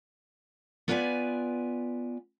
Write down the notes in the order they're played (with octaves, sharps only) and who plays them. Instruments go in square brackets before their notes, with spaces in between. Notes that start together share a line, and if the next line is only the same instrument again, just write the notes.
[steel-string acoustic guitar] B3 F4 B4 D5 F5 G#5